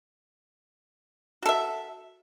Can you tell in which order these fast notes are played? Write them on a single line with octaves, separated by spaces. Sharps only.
F#4 A4 E5